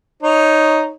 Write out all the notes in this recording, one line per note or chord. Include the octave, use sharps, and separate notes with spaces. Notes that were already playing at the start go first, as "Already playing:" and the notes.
D#4 C#5